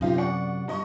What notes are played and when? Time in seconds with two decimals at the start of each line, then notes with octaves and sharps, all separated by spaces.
0.01 F#2 C3 D#4 F4 G4
0.17 D5 F#5 C#6
0.68 G2 D#5 C#6